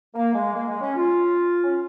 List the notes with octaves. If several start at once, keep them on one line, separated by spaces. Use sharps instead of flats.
A#3
G#3
A#3
G#3
C#4
F4
C#4